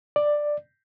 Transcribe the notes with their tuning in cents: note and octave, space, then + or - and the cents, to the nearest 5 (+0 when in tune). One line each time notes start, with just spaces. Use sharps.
D5 +10